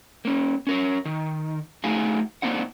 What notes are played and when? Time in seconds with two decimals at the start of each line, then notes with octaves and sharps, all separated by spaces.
0.25 A#3 C#4
0.67 C#4 A#4 C#5
1.05 D#3
1.84 A3 D#4 F#4 G#4 F5 G#5
2.42 A#3 C4 D4 D#4 F#5